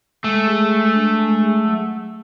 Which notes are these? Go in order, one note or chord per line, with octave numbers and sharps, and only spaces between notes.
G#3 A3
G#4
G#3
D4
G#3
G#4
F#3